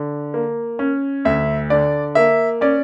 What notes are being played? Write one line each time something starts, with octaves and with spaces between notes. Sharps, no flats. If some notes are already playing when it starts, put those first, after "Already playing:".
Already playing: D3
A#3
C#4
D2 E5
D3 D5
A#3 E5
C#4 D5